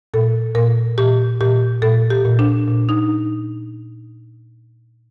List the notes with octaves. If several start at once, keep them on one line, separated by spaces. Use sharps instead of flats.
A#2 A4
A#2 A#4
A#2 G4
A#2 G4
A#2 A4
G4
A#2
D4
A#2
D#4